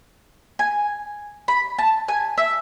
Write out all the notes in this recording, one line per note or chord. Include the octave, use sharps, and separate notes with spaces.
G#5
B5
A5
G#5
E5